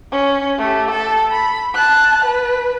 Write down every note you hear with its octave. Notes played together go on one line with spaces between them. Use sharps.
C#4
A3 G4
A4 A5
B5
A5 F#6
B4